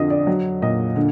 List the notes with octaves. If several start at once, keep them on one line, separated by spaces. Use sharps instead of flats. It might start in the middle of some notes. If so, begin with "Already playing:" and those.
Already playing: F2 D3 F3 D#5
D5
F#3
A#2 D#5
D3